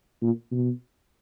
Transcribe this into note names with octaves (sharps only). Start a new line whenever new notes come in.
A#2
B2